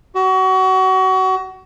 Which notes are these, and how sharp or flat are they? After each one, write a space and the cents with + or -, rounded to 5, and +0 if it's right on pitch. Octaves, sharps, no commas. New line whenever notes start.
F#4 +30